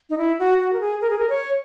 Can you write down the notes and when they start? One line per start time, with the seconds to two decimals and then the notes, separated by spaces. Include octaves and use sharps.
0.10 D#4
0.18 E4
0.39 F#4
0.60 F#4
0.73 A#4
0.80 G#4
1.01 A#4
1.10 G#4
1.19 A#4
1.29 C#5